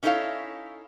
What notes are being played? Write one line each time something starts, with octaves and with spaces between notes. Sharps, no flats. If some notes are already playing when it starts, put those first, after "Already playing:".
C#4 D#4 E4 A4 C#5 F5